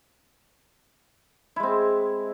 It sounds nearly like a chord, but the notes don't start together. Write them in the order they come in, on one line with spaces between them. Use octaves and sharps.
E4 G#3 C4